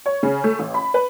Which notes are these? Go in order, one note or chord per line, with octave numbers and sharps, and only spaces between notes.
C#5
C#3
A3
A1
B5
B4